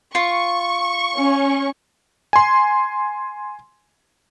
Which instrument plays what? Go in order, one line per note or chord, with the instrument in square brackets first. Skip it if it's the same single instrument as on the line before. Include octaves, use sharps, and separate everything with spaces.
[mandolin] F4 [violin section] C#6
[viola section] C#4
[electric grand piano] G#5 C6